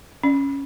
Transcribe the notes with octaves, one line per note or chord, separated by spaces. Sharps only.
C#4